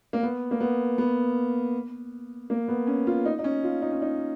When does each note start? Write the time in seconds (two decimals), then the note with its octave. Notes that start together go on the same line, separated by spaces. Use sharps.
0.13 A#3
0.23 B3
0.51 A#3
0.60 B3
0.98 B3
2.50 A#3
2.68 B3
2.87 C#4
3.07 F4
3.25 D#4
3.39 D#4
3.44 C#4
3.63 F4
3.82 D#4
3.92 C#4
4.02 D#4